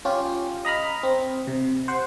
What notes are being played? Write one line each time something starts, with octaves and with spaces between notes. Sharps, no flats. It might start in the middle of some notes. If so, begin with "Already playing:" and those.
C#4 F4 G4
D#5 A#5 B5 F6
C4
C3
C5 F#5